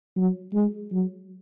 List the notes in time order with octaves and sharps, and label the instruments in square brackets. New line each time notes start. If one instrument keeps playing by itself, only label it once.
[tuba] F#3
G#3
F#3